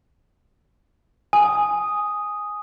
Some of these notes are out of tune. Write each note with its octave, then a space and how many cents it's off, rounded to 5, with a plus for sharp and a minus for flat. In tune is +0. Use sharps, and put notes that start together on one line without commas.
G#5 +0 D#6 +0